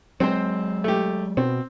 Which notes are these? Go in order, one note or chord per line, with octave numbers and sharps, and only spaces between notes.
F#3 G#3 C4 C5
A3 G4
B2 C4